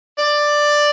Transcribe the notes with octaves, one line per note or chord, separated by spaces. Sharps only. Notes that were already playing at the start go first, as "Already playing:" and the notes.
D5